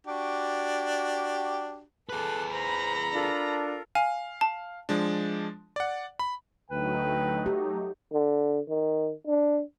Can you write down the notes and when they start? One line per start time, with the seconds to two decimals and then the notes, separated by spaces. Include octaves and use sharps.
0.07 D4 F#4 G4
2.09 G#4 A4 B4 D6 F#6
2.52 C5 A#5 B5
3.14 D4 F4 A4 A#4
3.95 F5 G#5
4.41 A5
4.89 F3 G#3 D4
5.76 D5 F#5
6.19 B5
6.71 D2 F#3 A3 D#4 B4 G5
7.46 G4
8.13 D3
8.69 D#3
9.27 D4